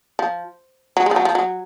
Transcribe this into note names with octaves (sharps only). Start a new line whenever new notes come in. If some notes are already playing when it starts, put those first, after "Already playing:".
F3
F#3
G#3
F3
F#3
F3
F#3